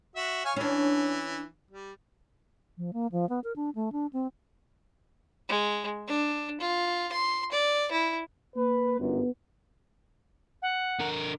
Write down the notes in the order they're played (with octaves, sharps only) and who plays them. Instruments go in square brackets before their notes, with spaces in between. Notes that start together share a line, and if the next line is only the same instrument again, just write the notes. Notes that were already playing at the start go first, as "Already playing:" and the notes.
[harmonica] F#4 E5
C#5 F5 G#5
[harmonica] E3 [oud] C#4 D4
[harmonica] G3
[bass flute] F3
A#3
F3
B3
A#4
D4
A3
D4
C4
[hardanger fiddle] G#3
D4
F4
C6
D5
E4
[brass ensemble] A#3 B4
[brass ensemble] G1 F#2 [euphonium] B3
[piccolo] F#5
[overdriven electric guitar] D3 A#4